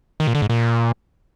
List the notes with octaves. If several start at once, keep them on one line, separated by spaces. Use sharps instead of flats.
D#3
A#2
D3
G#2
A#2